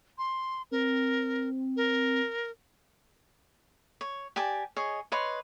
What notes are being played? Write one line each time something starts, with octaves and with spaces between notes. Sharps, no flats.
C6
C4 A#4
A#4
C#5
G4 D5 G#5 A5
G#4 C#5 D#5
B4 C#5 D#5 C6